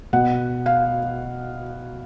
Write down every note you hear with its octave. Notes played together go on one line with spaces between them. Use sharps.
B2 F#5
F5